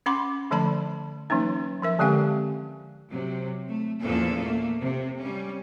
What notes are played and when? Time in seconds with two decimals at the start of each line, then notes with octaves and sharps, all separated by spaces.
0.06 C#4 F#5 B5 C6 D6
0.51 D3 F3 A3 D5 A5 B5
1.30 E3 F#3 A#3 C#4 D#4
1.82 F3 A#4 E5
1.99 D3 G#3 C4 G4 F5 G#5
3.11 C3 F#3
3.69 A3
4.03 E2 A#2 F3 C#4 A4
4.42 A3 A#3
4.81 C3
5.20 G3 C#4